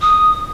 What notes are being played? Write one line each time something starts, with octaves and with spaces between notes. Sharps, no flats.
D#6